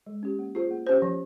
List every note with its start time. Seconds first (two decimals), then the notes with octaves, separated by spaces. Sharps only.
0.07 G#3
0.23 C#4 G4
0.39 A#3
0.55 F4 G#4 C5
0.71 A#3
0.87 C#4 G4 C5
1.02 F3